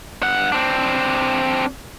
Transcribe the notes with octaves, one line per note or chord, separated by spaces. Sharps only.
G2 F#5
C4 D4